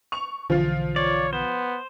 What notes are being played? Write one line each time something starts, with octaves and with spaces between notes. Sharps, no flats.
C#6 F7
B1 D3 E3 F3 F4
C#5 D5
B3 C5